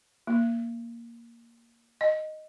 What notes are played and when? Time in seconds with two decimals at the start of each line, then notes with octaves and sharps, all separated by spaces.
0.27 A#3
2.01 D#5